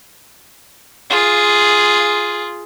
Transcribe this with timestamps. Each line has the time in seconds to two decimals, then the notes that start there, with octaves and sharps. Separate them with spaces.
1.10 F4 G#4